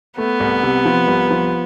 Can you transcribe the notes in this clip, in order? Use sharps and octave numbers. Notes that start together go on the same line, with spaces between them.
A3 B3
C2
C3
F3
C2
F3